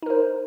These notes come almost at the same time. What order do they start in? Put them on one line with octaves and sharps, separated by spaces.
D#4 A#4 C5